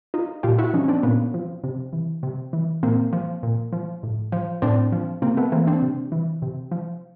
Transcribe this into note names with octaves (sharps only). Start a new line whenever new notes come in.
D#4 F4
A#2 F4 G4
E4 F#4
F3 C#4 D#4
C#4
C4 D4
A#2 B3 C#4
F3
C3
E3
C3
E3
A#2 A#3 C4
F3
A#2
F3
A2
F3
A2 C4 D4
F3
C3 A#3 C4
A3 B3
E3 A#3 C4
C4 D4
C3
E3
C3
F3